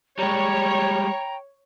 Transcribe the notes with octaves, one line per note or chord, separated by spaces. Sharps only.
G3 G#3 C#5 G5 A#5 B5